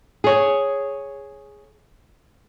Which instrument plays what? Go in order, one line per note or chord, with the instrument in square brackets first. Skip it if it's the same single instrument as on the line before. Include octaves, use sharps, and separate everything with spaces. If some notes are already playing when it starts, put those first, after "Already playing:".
[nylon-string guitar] G#4 C#5